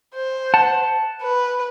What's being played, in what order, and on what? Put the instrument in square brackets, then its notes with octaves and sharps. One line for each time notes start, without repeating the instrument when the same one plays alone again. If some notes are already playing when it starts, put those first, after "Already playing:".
[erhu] C5
[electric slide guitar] F#5 A5
[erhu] B4